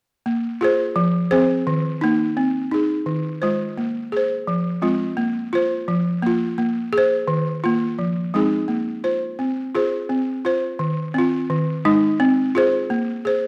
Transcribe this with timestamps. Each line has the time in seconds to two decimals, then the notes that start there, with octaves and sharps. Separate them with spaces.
0.26 A#3
0.61 F4 G#4 C5
0.96 F3
1.31 C4 G#4 C5
1.67 D#3
2.01 A#3 D#4
2.37 C4
2.71 D#4 G#4
3.06 D#3
3.42 G#3 F4 C5
3.77 A#3
4.12 G#4 C5
4.47 F3
4.82 G#3 C4 F4
5.17 A#3
5.53 F4 C5
5.88 F3
6.22 A#3 F4
6.58 A#3
6.93 G#4
6.98 C5
7.28 D#3
7.64 A#3 F4
7.99 F3
8.34 G#3 C4 D#4 G#4
8.68 A#3
9.04 F4 C5
9.39 C4
9.75 F4 G#4 C5
10.09 C4
10.45 F4 C5
10.79 D#3
11.14 C4 F4
11.50 D#3
11.85 G#3 D#4
12.20 C4
12.55 F4 G#4 C5
12.90 A#3
13.25 G#4 C5